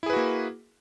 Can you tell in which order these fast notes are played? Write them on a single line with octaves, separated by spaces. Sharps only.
E4 G#4 B4 F#4 A#3